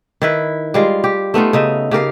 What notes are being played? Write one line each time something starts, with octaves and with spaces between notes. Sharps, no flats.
D#3 E4 B4
G3 G#3 F4
G4
A3 B3 D#4 F4
C#3 D#4 E5
C#3 G4 A#4 F5